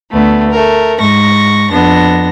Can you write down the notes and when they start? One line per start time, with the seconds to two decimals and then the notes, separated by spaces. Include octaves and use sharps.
0.11 D2 A3 B3
0.51 A3 A#4
0.98 G#2 C#6 A#6
1.70 F2 B3 D4 A#6